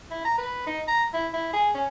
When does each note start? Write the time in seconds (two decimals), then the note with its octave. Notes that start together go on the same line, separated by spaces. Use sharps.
0.11 E4
0.25 A#5
0.38 B4
0.67 D#4
0.88 A#5
1.14 E4
1.34 E4
1.53 G#4
1.75 C#4